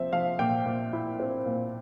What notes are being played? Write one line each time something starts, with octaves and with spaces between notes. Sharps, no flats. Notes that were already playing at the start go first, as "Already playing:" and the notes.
Already playing: F3 C4 E5
F3 F5
A#2 G5
A#2
E4
C4
A#2